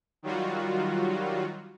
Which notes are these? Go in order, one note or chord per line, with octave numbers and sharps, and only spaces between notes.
D#3 F#3 G3 F4 F#4